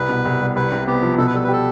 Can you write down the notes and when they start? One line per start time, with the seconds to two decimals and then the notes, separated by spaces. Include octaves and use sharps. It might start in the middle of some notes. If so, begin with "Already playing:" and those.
Already playing: C2 B4
0.09 B2
0.25 C2
0.41 G3
0.56 C2 B4
0.72 C3
0.87 B3 G4
1.03 F3
1.18 B2 A4
1.27 B4
1.34 G3 A4
1.44 B4
1.48 G4 A4